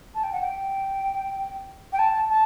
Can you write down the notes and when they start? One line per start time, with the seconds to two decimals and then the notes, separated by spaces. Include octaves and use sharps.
0.15 A5
0.23 G5
0.32 F#5
0.41 G5
1.92 G5
1.99 A5
2.29 A5